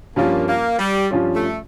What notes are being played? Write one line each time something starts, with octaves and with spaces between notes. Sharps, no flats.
G2 F3 A#3 C#4 F4
A#3
G3
G2 F3 C#4 F4
A3